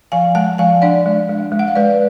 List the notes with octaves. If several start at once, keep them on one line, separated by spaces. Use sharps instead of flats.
F3 F5 G#5
G#3 F#5 A5
F3 F5 G#5
D4 D5 F#5
G#3
G#3
G#3
F#5
F5
G#3 B4 D5